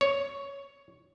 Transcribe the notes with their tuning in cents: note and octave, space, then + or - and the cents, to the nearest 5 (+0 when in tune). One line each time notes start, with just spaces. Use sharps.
C#5 +5